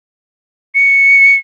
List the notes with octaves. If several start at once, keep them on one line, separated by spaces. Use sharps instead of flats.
C#7